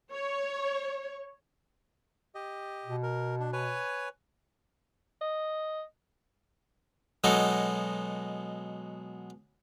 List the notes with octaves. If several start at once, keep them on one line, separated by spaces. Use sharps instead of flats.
C#5
G4 D#5
B2
A#4
D4
B4 C#5 G#5
D#5
B2 F#3 G#3 B3 D#4 A4